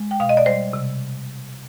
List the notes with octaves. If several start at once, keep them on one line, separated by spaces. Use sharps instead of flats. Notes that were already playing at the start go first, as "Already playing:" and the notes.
Already playing: G#3
G5
B2 F5
D#5
D5
G3 C5
C3